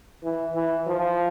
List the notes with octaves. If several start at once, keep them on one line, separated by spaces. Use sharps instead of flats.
E3
E3
F3